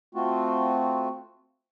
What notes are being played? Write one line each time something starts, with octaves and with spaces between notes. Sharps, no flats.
A3 C4 F4 F#4